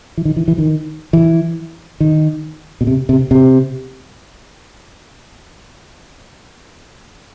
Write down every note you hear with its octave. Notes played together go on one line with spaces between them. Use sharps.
E3
D#3
E3
E3
D#3
E3
D#3
B2
C3
C3
C3